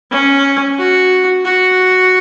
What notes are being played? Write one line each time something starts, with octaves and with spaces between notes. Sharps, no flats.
C#4
F#4
F#4